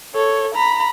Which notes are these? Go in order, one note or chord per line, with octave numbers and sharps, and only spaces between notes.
A4 C#5
A#5 B5